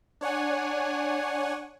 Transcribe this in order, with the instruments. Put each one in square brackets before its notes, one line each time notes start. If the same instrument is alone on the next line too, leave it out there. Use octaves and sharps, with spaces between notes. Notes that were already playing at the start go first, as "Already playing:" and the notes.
[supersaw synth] D4 C#5 F#5 G#5